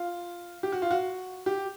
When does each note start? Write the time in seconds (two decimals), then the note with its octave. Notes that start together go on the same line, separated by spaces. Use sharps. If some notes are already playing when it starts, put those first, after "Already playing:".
Already playing: F4
0.63 G4
0.72 F#4
0.82 F4
0.91 F#4
1.46 G4